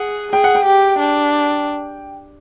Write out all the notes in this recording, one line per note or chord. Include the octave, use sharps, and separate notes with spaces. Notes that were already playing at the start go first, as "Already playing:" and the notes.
Already playing: G#4 F#5
G#4 G5
F#5
G5
G4
D4